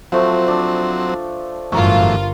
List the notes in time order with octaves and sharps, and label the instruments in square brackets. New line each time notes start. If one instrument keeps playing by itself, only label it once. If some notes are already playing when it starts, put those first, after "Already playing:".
[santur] F3 A3 [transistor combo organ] F#3 C4
[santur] D4
[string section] G1 F4 [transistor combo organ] F#2 A2 E3 [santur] A#4 A#5 C#6